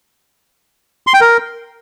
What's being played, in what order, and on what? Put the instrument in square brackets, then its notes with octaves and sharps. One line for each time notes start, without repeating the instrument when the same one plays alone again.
[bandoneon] C6
G5
A#4